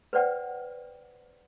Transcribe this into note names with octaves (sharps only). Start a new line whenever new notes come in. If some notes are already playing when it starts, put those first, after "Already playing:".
B4 C5 D5 F#5 G5